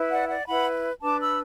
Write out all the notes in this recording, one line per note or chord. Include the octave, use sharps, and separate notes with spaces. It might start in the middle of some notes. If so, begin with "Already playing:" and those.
Already playing: E4 B4
D5 F#5
D5 F#5
E4 B4 F#5 B5
D4 B4 A5 D6
B5 E6